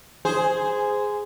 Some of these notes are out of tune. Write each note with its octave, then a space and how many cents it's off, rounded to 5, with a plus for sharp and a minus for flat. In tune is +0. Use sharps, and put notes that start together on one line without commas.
G#4 +0 C5 -15